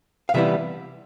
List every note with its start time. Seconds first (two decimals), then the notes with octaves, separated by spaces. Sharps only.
0.29 F5
0.34 C3 E3 G3 B3 E4 E5